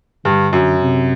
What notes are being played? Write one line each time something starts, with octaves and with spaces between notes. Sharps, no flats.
G2 D3
F#2
C3